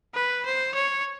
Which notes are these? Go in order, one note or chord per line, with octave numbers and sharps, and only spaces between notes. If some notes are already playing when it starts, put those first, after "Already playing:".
B4
C5
C#5